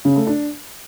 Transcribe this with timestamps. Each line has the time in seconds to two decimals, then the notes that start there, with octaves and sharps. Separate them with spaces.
0.05 C#3
0.16 A3
0.27 D4